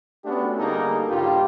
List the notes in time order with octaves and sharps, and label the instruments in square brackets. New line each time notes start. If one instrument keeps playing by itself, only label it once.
[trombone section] A3 B3 C#4 D4 F#4 G4
D3 G3 A#3 D#4 G#4 A4
A#1 G2 C#3 F4 G4